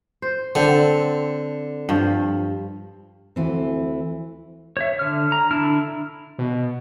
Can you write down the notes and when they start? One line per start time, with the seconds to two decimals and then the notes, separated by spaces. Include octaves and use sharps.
0.22 C5
0.55 D3 C4 A4
1.89 G2 F3
3.36 D2 E3 C4
4.77 C#5 E5
4.99 D3 F6
5.32 A#5
5.51 D3 D4 E4 F6
6.39 B2